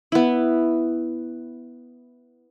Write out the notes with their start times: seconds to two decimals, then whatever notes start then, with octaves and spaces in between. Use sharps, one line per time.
0.12 B3 E4